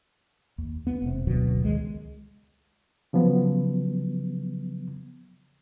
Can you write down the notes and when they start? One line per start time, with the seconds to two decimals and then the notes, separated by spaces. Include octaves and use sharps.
0.58 D#2
0.87 B3
1.02 E1 C3
1.27 F#1 D2 B2 F#3
1.62 C#2 D#3 F3 G#3
3.13 C#3 F3 F#3 B3